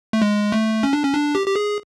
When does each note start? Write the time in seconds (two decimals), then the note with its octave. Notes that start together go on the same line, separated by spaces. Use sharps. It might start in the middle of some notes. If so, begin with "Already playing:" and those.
0.13 A3
0.22 G#3
0.52 A3
0.83 C#4
0.93 D4
1.03 C#4
1.14 D4
1.35 G4
1.47 G4
1.56 G#4